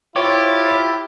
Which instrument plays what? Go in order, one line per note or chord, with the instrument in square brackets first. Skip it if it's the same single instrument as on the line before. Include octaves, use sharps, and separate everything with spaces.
[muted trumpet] E4 [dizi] F4 [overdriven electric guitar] G4 [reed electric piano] C5 C#5 D6